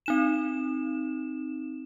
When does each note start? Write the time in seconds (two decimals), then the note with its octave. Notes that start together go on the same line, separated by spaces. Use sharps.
0.06 C4 D#4 E7